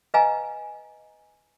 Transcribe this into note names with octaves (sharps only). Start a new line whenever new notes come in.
B4 D#5 F5 G#5 A#5